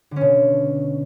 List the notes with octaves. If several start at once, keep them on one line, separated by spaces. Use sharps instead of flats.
B2 D3 C#4